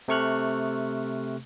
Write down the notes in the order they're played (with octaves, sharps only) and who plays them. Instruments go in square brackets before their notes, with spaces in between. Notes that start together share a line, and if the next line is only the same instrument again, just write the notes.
[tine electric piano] C3 A3 C#6 F6 F#6